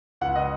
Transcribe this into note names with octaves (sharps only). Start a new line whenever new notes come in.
C#2 F#5
D#5